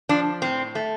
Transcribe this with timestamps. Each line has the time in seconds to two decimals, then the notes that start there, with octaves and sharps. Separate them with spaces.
0.09 F3 D4
0.42 A2 C4
0.75 A3